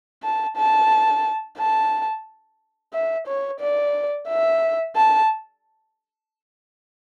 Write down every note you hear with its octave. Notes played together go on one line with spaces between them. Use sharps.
A5
A5
A5
E5
C#5
D5
E5
A5